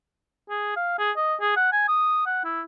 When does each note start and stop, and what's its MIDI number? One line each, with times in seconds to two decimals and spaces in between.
0.49 0.73 68
0.76 0.96 77
0.98 1.11 68
1.16 1.35 75
1.41 1.52 68
1.56 1.72 78
1.72 1.87 80
1.88 2.25 87
2.26 2.43 78
2.44 2.61 64